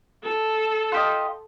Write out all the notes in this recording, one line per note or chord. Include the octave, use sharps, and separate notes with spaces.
A4
F4 G4 D#5